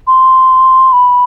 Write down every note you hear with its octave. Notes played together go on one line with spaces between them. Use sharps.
C6
B5